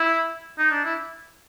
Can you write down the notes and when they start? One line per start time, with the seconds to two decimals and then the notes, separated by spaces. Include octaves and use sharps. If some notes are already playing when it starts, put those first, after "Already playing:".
Already playing: E4
0.58 D#4
0.71 D4
0.84 E4